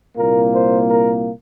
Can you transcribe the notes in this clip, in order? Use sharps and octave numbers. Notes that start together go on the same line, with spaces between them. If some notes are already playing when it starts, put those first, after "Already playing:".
C2 A#2 A#3 A#4
C5
A#4